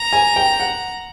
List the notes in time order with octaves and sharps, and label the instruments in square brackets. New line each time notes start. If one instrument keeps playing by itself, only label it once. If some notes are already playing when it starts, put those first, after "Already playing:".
Already playing: [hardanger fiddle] A#5
[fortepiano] G#5
G5
F#5